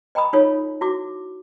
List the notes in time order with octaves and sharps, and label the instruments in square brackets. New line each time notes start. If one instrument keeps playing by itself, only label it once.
[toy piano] D#5 G5 A#5 B5 D#6
D#4 F4 A4 C#5
E4 F#4 D6